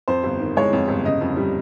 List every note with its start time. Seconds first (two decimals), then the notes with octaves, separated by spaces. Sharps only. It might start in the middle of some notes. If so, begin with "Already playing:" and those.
0.08 F2 C5
0.24 G1
0.40 D#3
0.56 G#3 C#5
0.73 F2
0.88 G1
1.05 C#3 D#5
1.21 F2
1.36 G3